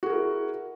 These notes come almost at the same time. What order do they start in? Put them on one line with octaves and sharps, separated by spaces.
F#4 G#4 A#4 E4